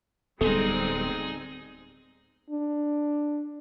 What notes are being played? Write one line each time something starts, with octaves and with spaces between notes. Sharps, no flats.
D1 G3 G#3 B3 C4 D#4 G#4 A4
D4